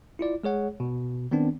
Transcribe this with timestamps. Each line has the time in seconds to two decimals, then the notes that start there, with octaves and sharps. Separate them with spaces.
0.19 E4 F4 D5
0.44 G#3 G#4 C#5 F#5
0.80 B2
1.31 D#3 B3 C4 D4